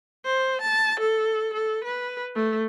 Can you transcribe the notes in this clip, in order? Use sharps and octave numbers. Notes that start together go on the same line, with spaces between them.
C5
A5
A4
A4
B4
A3